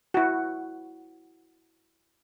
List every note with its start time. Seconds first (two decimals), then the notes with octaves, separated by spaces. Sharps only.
0.14 E4 F#4